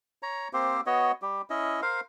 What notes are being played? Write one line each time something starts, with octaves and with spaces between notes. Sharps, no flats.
C#5 A#5
A#3 C4 G4 C5
B3 F#4 C#5 D#5
G3 G4
C#4 E4 D#5
A#4 C5 F5